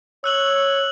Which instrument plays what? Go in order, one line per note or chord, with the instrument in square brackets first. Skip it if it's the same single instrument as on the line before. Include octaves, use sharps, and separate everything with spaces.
[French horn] C#5 [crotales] E6 F#6 F#7